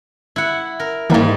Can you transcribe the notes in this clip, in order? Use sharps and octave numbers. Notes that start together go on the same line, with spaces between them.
E4 F#5
A#4
G#2 E3 G3 A#3